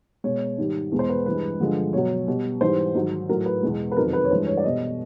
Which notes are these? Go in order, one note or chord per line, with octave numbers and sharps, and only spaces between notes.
B2 G#3 C#5
G#2 D#3 G3
E2 B2 G#3
C5
B4
G2 E3 G#3 B4
G2 D3 F3 G#3
B2 F#3 C#5
B2 G3
G#2 E3 G3 C5
G#2 D#3 F#3
A2 F#3 A#4
B4
E2 B2 G#3
B4
F2 C3 D#3 F#3 A#4
B4
C#5
G2 E3 G#3 C5
C#5
D5
B2 G3 D#5